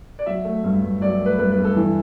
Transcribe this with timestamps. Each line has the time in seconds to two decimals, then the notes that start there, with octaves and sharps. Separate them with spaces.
0.19 D5
0.26 F#3 E5
0.44 A3
0.64 G2
0.82 G2
1.01 F#3 D5
1.20 A3
1.26 B4
1.38 G2 B4
1.52 B4
1.58 G2
1.64 A4
1.76 E3